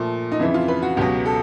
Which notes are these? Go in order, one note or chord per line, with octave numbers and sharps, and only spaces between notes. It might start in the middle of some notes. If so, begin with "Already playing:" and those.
Already playing: A#2 F3 A3
D#4
F2 C#3 E3 E4
F4
B4
F#4
C#2 B2 F#3 G4
A4